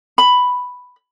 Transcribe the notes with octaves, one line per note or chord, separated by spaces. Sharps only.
B5